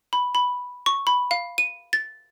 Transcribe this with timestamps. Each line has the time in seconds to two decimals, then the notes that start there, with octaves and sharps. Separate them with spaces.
0.13 B5
0.35 B5
0.86 C#6
1.07 B5
1.31 F5
1.58 D#7
1.93 A6